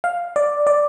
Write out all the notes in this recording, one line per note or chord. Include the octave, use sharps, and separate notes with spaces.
F5
D5
D5